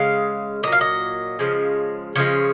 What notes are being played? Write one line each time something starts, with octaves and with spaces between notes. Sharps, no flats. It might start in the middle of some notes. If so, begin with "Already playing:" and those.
Already playing: C#3 G#3 F5
A#2 F#3 D#5
F5
D#5
C#3 F3 G#3
C#3 F3 G#3 C#5